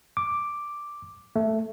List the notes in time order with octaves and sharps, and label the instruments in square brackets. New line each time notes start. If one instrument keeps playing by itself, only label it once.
[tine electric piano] D6
A3